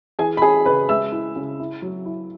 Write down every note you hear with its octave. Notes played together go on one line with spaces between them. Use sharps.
E3 G#4 G#5
B5
C#4 G#4 G#5
C#3 B4 B5
G#3 E5 E6
E4
C#3
E4
F#3
E4